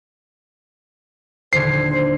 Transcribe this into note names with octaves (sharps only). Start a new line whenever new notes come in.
D#1 D3 C5 G#6 C7